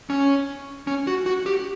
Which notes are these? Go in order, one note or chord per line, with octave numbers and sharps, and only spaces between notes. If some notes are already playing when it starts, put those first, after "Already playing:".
C#4
C#4
F#4
F#4
G4